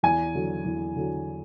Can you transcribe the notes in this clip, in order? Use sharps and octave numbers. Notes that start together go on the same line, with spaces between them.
E2 G#5
D3 F#3
E2
D3 F#3